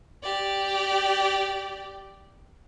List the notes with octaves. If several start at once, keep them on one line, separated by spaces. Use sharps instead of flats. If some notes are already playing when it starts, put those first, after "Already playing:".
G4 D5